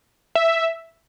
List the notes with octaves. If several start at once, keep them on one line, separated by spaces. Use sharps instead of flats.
E5